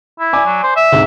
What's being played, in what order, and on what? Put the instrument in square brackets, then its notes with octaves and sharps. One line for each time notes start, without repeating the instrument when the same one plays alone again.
[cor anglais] E4
[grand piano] D5 G#5 D6
[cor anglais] F#3
C5
E5
[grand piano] D2 G#2 C3